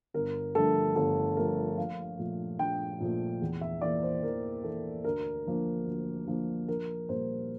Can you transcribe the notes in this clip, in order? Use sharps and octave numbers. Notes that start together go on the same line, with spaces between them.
G1 A#4
G2 D3 F3 A3 A4
G1 A4
G2 D3 F3 A3 A#4
A#1 F5
A#2 F3 A3
A#1 G5
A#2 F3 A3
E2
E5
E3 A#3 D5
C5
E2 A#4
E3 A#3 A4
D2 A#4
D3 F3 A#3
D2
D3 F3 A#3
A#1 A#4
A#2 G3 A#3 C5